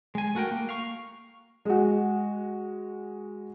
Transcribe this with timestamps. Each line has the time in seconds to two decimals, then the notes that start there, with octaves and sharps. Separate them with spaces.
0.15 G#3 G#5
0.35 A3 F#4 A#4 G5
0.51 A#3
0.69 F5 C#6
1.65 G#3 F#4